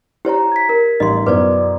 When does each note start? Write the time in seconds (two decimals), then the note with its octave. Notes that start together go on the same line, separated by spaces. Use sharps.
0.25 E4 G4 C5 C#5 A#5
0.52 G#6 B6
0.69 A#4
1.00 A1 G3 D#4 D#5 C6
1.26 F#2 B2 E4 B4 C5 D5 D6